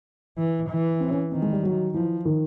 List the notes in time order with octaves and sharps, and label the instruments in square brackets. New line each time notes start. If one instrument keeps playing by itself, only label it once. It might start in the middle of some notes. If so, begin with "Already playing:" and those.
[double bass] E3
E3
[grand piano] C4
C#4
[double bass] D#3 [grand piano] C4
[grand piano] G#3
G3
F#3
[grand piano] E3 [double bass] F3
[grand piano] D#3